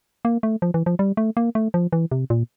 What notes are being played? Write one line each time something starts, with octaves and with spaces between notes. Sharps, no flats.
A#3
A3
F3
E3
F3
G3
A3
A#3
A3
F3
E3
C3
A#2